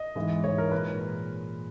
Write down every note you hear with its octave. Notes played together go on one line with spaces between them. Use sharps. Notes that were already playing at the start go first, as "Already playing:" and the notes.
Already playing: D#5
G#2 E3 G#3
G#2 E3 G#3 C#5
A#4
A#2 G#3 B4